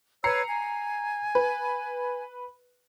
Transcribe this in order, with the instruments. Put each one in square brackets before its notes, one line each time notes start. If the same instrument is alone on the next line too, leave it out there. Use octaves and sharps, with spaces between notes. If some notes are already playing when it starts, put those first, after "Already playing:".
[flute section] B4 C#5 E6 [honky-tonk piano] A#5 C7 C#7
[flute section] G#5
[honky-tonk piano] B4